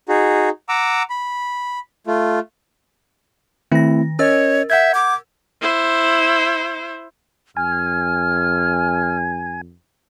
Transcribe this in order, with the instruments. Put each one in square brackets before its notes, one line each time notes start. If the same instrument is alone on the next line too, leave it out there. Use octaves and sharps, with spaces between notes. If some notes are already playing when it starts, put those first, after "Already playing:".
[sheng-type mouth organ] D#4 F#4 G#4
F#5 A#5 D6 E6
B5
A3 F4
[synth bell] D#3 A#6 [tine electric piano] A3 C4 E4
[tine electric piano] C#4 D#5 [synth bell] A#4 E6 A6 [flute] C#5
[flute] E5 [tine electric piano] F#5 G6 G#6
[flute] D6
[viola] E4 C5
[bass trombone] F2 [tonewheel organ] G#5 [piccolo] F6